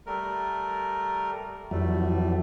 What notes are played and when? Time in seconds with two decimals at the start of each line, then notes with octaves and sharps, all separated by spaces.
0.06 G3 A3 A#4
1.71 F2 E3 F#3 G3 A3